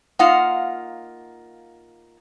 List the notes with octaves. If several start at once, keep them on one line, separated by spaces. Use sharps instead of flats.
A#3 D#4 F4 F5 F#5